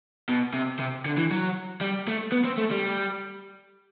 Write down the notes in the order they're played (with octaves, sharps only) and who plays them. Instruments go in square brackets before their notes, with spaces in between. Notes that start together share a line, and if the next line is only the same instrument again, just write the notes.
[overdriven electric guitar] B2
C3
C3
D3
E3
F#3
G3
A3
B3
C4
A3
G3